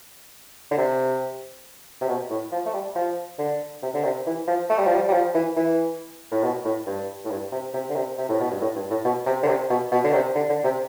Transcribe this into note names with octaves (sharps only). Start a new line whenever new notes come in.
D3
C3
C3
B2
A2
F3
A3
G3
F3
D3
C3
D3
C3
E3
F3
A3
G3
F3
G3
G3
F3
E3
E3
A2
B2
A2
G2
A2
G2
C3
C3
D3
C3
C3
A2
B2
G2
A2
G2
A2
B2
C3
D3
C3
B2
B2
D3
C3
D3
D3
C3